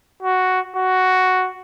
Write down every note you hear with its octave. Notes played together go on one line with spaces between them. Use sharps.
F#4
F#4